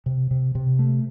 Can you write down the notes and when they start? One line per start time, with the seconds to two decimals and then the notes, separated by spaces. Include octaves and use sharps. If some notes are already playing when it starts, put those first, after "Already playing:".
0.06 C3
0.31 C3
0.55 C3
0.79 A3